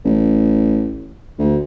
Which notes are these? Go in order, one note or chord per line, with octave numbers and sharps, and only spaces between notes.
A1
D2